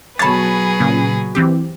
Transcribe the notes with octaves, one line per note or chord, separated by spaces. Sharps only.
B2 F#3 G#4 B4 C#5 A5 B5 A6
A#2 C#3
E3 C4 G4